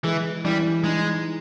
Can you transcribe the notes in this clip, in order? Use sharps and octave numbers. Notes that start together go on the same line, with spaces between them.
E3 G#3
E3 G3
G#3 D#4